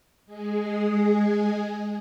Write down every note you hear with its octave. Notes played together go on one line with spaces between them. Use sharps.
G#3 G#4